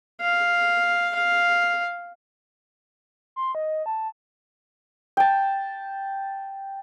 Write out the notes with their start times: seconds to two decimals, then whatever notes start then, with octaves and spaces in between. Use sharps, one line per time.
0.21 F5
1.15 F5
3.36 C6
3.55 D#5
3.86 A5
5.17 G5 A5